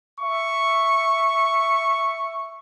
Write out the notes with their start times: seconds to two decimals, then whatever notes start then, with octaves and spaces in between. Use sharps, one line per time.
0.20 E5 C#6